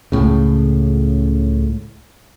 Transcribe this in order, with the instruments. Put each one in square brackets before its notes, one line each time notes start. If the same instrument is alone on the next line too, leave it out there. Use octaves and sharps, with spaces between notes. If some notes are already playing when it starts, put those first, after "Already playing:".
[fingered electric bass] C#2 A2 C#3